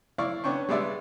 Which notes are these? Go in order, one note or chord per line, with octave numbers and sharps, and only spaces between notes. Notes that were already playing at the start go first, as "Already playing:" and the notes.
E4 D5 F5 C#6
B3 C#4 D4 G5 C#6
G3 G#3 B3 D5 E5